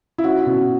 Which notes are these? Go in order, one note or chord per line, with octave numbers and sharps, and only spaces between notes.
E4
C#4 F#4
B2